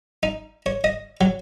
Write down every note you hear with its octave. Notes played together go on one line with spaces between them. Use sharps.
D#4
C#5
D#5
F#3